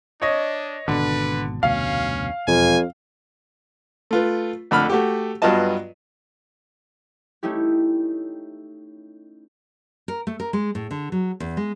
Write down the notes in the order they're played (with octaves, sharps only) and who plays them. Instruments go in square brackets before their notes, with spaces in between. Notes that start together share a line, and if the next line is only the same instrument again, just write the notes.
[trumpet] D4 [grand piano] C#5 D#5
[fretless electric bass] G#1 B2 [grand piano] D3 [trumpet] B4
[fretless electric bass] F1 D2 B2 [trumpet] C#4 [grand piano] F5
[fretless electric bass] E1 [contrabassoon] F2 [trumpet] G#5
[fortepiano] A3 F4 B4
F2 D3 A3 B5 F6
A3 F#4 G4
G2 F#3 B3 F4 D#5 A5
[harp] A3 C#4 D#4 E4 G4
[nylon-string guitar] A#4
A3
A#4
G#3
A2
D3
F#3
E2
G#3